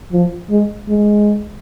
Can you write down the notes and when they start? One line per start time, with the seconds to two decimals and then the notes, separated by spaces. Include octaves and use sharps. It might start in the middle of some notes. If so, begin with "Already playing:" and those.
0.12 F3
0.51 G#3
0.89 G#3